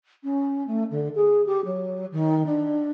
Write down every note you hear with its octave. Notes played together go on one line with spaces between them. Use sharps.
C#4
A3
D3
G#4
G4
F#3
D#3
D4